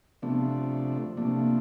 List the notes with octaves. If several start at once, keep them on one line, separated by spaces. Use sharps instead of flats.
C3 F3 A3 B3 D4
C3 F3 A3 A#3 D4